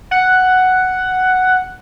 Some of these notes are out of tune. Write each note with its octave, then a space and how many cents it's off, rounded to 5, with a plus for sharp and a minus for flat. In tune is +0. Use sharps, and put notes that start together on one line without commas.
F#5 +5